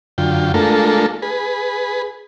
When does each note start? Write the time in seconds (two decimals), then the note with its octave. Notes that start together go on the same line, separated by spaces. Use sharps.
0.18 F#2 D3 F4 G5
0.54 G#3 A3 D4 F4 A4 A#4
1.22 G#4 B4